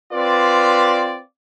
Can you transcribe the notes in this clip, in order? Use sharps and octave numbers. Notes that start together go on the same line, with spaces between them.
C4 F4 B4 D5